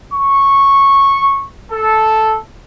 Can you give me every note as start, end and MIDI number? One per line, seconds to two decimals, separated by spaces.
0.12 1.46 85
1.70 2.35 69